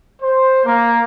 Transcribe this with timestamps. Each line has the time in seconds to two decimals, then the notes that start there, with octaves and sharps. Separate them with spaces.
0.22 C5
0.65 A#3